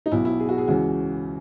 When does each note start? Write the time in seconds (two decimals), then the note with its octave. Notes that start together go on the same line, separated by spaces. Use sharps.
0.06 D#4
0.12 B1 B2 E4
0.25 E4
0.40 G#4
0.49 F#4
0.58 G#4
0.68 C#2 C#3 E3 F#4